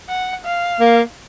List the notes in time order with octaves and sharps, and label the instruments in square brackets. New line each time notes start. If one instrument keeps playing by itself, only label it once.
[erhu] F#5
F5
[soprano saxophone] A#3